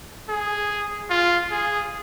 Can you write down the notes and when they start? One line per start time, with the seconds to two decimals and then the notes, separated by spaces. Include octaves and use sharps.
0.29 G#4
1.10 F4
1.51 G#4